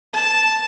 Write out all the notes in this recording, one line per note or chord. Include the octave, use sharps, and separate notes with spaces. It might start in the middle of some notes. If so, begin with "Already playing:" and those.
A5